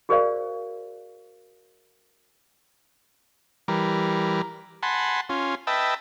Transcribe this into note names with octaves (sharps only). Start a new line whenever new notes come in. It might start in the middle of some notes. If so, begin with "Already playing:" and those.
F#4 G#4 A#4 C5 D5 F5
E3 G3 A#4
F#5 G#5 A5 B5 C6
C#4 F4
B4 D#5 E5 G5 A5